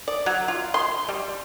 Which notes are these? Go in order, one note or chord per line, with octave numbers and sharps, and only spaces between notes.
D5
F#3
F4
C6
G3